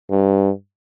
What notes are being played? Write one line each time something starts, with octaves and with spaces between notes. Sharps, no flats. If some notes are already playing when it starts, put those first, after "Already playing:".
G2